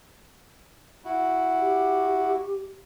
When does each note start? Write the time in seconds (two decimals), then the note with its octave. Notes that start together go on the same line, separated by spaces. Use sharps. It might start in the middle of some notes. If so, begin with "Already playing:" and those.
1.05 E4 F#4
1.59 G4